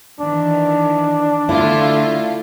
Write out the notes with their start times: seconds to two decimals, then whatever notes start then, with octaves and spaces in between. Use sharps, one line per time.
0.21 D#3 E3 D4
1.49 D3 A3 E4 F4